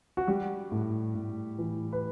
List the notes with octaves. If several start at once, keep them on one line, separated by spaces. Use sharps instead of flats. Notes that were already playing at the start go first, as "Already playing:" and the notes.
F#4
G3 G4
A2
A2
E3
B4